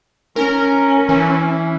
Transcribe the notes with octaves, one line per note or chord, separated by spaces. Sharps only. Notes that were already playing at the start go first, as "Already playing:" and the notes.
C#4 A#4
E3